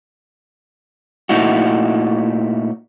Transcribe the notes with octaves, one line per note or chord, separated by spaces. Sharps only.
A#2 A3 D#4 E4 F#4